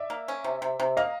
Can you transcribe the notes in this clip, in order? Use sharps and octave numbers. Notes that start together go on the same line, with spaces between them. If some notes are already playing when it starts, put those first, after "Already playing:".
Already playing: D5 E5
A#3
C#4
C3
C3
C3
A#3 D#5 F5